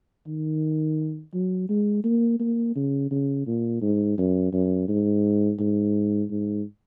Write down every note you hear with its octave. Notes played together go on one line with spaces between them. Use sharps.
D#3
F#3
G#3
A#3
A#3
C#3
C#3
A#2
G#2
F#2
F#2
G#2
G#2
G#2